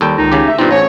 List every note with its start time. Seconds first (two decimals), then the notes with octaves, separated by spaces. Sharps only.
0.01 D#2 G3 A4 G5
0.18 C#2 D#3 D#4
0.32 C#3 G4
0.47 A3 E5
0.59 G2 B2 B3 C4 D#4 F4
0.71 A1 G#4 C5 C#5